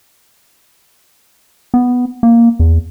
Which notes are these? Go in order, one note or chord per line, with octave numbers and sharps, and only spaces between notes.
B3
A#3
E2